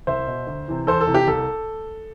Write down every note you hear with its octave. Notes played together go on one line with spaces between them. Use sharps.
C2 C5 E5
B2
D2
C3 E3
E2 A4 C5
A4
C3 E3
G4
C2 A4